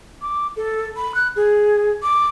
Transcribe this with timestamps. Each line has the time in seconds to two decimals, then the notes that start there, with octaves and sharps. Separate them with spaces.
0.22 D6
0.57 A4
0.97 B5
1.15 F#6
1.36 G#4
2.03 D6